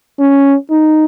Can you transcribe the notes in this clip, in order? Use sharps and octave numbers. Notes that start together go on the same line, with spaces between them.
C#4
D#4